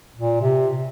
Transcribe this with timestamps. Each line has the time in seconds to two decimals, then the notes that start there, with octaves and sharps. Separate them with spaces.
0.17 A#2
0.42 C3